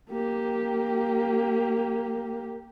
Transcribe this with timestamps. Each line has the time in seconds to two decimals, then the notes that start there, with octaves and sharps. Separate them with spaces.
0.11 A#3 G4